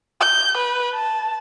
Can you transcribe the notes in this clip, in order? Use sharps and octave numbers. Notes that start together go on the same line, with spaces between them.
G6
B4
A5